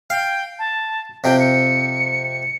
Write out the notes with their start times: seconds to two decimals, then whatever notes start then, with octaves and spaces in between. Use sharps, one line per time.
0.10 F5 G5
0.59 A5
1.24 F2 C3 C4 G5
1.40 C#7